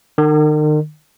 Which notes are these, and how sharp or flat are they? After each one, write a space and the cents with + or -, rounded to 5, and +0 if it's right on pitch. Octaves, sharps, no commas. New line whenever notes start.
D#3 -40